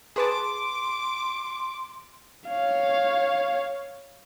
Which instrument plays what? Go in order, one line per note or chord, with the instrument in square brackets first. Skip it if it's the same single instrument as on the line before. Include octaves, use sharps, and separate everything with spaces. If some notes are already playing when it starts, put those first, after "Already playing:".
[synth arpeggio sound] G#4 B4 A5 [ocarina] C6 [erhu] D6
[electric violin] C#5 F5